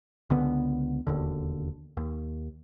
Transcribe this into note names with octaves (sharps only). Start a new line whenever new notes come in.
C#2 D3 B3
E1 D#2 D3
D#2